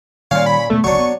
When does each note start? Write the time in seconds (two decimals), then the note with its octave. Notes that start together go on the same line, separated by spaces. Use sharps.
0.31 A#2 D#3 G3 C#4 F5
0.46 B5
0.70 B2 G#3 A3 B3
0.84 F#1 D2 D3 F#3 D4 C#6
0.99 B3